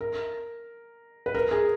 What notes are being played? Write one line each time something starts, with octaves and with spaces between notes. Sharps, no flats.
A#4
B4
A#4
G#4